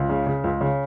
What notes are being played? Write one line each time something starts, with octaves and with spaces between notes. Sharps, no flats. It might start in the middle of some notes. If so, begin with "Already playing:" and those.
Already playing: C#2
C#3
C#3
C#2
C#3